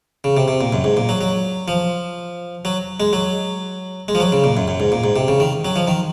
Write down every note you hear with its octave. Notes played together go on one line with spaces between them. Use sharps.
C#3
C3
C3
A#2
F#2
G#2
A#2
F#3
F#3
F3
F#3
G#3
F#3
G#3
F3
F#3
C#3
A#2
F#2
F#2
G#2
A#2
G#2
C3
C#3
D#3
F#3
F3
D#3